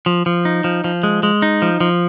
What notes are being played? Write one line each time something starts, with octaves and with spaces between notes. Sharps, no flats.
F3
F3
D#4
F3
F3
G#3
G#3
D#4
F3
F3